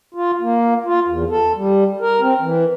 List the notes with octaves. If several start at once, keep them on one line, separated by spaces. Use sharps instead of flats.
F4
A#3
F4
E2
A4
G3
A#4
C4
E3